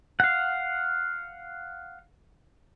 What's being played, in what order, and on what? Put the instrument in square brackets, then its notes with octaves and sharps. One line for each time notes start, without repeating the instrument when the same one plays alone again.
[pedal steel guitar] F5 F#5